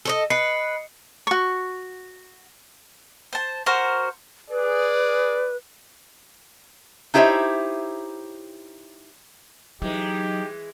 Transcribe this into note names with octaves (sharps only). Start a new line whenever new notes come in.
A4 C#5 D#5
B4 D#5 C7 C#7
F#4 C#6
C5 A5
F#4 A#4 C5
G#4 B4 D5
D#4 E4 G4 C5 C#5 E5
E3 F#3 G#3 D#4 G4